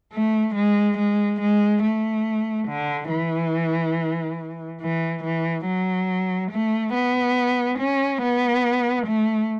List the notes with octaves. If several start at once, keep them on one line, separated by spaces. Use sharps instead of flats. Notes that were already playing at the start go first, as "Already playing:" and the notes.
A3
G#3
G#3
G#3
A3
D3
E3
E3
E3
F#3
A3
B3
C#4
B3
A3